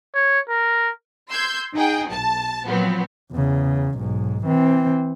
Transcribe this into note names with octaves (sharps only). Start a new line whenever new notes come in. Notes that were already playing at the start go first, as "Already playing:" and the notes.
C#5
A#4
C6 E6 G6 G#6
D#4 G#4 F#5 G5
B1 A5
A#2 F3 F#3 B3 C4
E2 C#3
B1 G#2
E3 C4